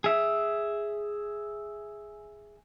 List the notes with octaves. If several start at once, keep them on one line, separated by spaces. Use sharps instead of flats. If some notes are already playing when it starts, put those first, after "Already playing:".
G#4 E5